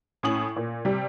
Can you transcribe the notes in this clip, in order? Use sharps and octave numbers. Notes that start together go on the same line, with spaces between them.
A2 C#4 G#5 D#6 F#7
A#2
C3 G3 G4